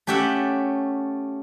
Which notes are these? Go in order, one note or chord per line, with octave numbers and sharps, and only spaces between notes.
A3 C#4 G4 D5 E5 F#5